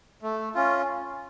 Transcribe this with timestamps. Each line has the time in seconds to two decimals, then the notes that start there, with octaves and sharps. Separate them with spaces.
0.22 A3
0.55 C#4 F4